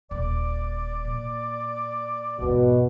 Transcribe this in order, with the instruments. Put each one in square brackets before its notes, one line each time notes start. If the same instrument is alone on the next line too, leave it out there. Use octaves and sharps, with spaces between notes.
[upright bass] D#1 [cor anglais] D5
[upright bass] A#2
[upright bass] G#1 E2 [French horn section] B2